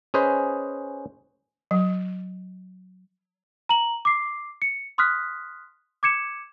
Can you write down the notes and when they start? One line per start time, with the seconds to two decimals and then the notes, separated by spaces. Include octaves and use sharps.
0.14 C#4 G#4 B4 C5 D#5
1.71 F#3
3.69 A#5 F#7
4.05 D6 C7
4.62 C#7
4.98 C6 D#6 F6 F#6 B6
6.03 D6 G#6 C#7 E7